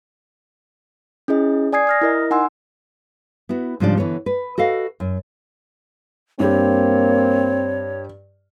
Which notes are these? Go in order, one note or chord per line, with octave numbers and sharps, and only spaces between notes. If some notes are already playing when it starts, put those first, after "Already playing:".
C#4 E4 G#4 D#5
D5 G#5 D#6 G#6 C7
D#6 F6 A#6
E4 A#4 D#5
D#4 F#5 G#5 C6 E6
B3 E4 F#4
G#2 C#3 F3 G3 D4 D5
D3 E3 B3 C#5
B4
F#4 A4 D#5 F5
F#2
G2 A#3 C4 G4 C#5